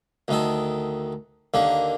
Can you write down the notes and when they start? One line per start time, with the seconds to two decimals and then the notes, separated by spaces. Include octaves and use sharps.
0.28 D2 D#3 A4
1.54 D#2 D3 A#3